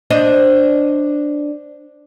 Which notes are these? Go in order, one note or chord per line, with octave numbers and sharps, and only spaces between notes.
D4 C5 D#5